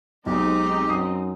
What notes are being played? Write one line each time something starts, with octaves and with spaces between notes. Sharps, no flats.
B1 G#3 C4 D#4 G4 D#5
F#2 D#6 C7